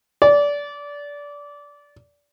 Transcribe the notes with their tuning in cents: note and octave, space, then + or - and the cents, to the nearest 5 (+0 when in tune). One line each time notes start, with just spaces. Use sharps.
D5 -20